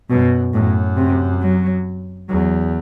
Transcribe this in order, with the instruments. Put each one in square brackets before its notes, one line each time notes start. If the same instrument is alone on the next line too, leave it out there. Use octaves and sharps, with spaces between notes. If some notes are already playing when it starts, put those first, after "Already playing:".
[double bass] F#2 [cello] B2
[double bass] F#2 [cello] A2
[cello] C3
F#3
[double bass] E2 [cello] F#3